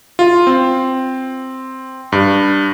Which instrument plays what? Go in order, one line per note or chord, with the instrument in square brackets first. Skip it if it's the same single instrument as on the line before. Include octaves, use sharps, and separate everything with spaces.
[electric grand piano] F4
C4
G2